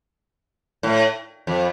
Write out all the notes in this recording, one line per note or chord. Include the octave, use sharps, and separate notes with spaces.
A2
F2